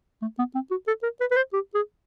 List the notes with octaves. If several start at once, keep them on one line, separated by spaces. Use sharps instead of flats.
A3
B3
C4
F#4
A4
A#4
B4
B4
C5
G4
G#4